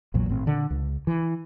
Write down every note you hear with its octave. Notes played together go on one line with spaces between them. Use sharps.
A#1 E2 A#2 F#3
G#1 A2 C4
A#2 D3
C#2
E3